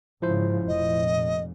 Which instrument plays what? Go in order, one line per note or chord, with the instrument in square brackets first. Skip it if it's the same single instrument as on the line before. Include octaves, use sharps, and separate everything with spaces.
[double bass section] G#2 C#3 [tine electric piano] F3 E4 C5
[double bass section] F1 A#2 [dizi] D#5